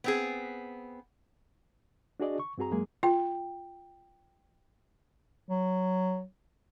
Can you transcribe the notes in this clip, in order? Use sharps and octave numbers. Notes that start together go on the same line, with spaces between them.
B3 C4 G#4
D4 F#4 G#4 D5 D#5
C#6
G2 C4 F#4 G#4 A#5
F#2 F#3 G#3 A#3 G#4
F4 G5
F#3